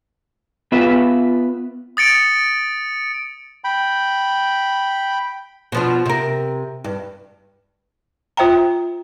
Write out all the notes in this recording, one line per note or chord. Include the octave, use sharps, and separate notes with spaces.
B3 F4 B4 E5
D#6 A6 C#7 D7
G5 B5
B2 F3 D4
C3 A#4
G2
F4 C5 E5 G5 A#5